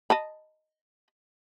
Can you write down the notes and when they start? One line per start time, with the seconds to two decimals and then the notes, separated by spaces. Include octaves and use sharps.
0.10 D#5 A5 B5